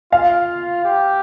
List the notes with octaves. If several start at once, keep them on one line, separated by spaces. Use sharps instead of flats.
F4 F5
G4